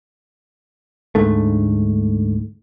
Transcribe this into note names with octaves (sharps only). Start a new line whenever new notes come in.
D2 G#2 D3 A3